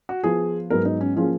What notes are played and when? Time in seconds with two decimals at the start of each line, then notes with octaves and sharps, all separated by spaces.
0.09 F#4
0.23 F3 B3 F4 G#4
0.70 G#2 F#3 B3 A#4
0.85 D#4
1.01 C#4
1.16 F3 A#3 C#4 F4 G#4